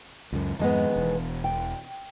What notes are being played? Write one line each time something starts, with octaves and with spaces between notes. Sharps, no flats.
C#2 F#2
F2 G#2 D#3 G#3 B3
E1 E2
G5